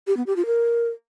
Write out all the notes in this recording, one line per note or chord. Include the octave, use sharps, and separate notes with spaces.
G4
B3
G4
F4
A#4